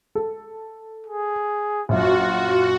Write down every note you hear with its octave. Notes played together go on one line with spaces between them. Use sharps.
A4
G#4
A#1 F#2 F4 F#4